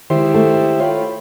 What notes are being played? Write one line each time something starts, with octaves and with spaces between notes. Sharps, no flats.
D#3 G#3 E4 G4 C5
A3
F4 C#5 G5 B5